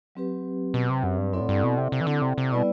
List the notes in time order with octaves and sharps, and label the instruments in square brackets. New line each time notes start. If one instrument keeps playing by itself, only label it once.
[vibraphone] F#3 C4 G4 B4
[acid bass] B2
C3
F#2
G2
[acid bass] F#2 [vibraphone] C4 E4 A4 D5 F#5
[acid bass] A2
G2
B2
C3
C3
E3
D3
C3
C3
[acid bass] B2 [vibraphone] G3 B3 E4 B4 D5